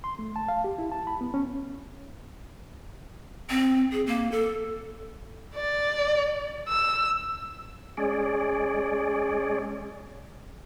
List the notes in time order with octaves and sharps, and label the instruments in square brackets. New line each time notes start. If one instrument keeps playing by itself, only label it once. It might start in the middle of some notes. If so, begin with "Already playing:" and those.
[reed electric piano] C6
A3
A5
F5
G4
E4
A5
B5
B3
C#4
[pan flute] C4
G#4
A#3
A4
[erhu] D5
E6
[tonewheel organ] G#3 C#4 G#4 D5